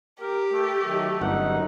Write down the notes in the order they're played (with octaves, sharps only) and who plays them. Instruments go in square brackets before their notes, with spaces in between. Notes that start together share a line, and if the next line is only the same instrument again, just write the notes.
[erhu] G4 [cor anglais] A#4
[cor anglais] A3
[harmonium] D#3 F#3 E5
[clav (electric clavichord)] G1 [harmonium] F#2 D#4 [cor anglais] F#5